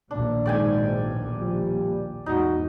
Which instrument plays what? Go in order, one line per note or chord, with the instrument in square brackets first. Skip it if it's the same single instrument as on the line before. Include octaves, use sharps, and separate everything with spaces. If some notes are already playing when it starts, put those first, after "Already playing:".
[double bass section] A#1 D#2 B2 [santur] D4
[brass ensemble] G#2 [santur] D5 G5 G#5
[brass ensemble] F3 G3
[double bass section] E2 G#2 [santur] D#4 [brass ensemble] F#4